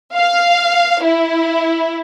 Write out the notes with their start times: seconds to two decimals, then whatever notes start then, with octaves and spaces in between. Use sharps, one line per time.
0.15 F5
1.04 E4